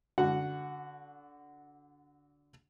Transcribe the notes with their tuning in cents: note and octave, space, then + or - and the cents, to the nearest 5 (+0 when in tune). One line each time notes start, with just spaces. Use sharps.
D3 -20 F#4 +0 F#5 +0